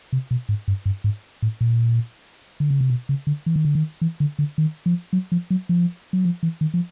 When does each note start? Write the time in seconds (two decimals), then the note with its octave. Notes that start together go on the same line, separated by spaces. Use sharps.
0.13 C3
0.31 B2
0.49 G#2
0.68 G2
0.86 G2
1.04 G#2
1.42 A2
1.61 A#2
2.60 D3
2.70 C#3
2.81 C3
2.90 B2
3.09 C#3
3.27 D3
3.46 E3
3.56 D#3
3.65 D3
3.75 D#3
4.01 E3
4.20 D3
4.39 D3
4.58 D#3
4.86 F3
5.13 F#3
5.32 F3
5.50 F#3
5.69 F3
6.13 F#3
6.25 F3
6.43 E3
6.61 D#3
6.74 F3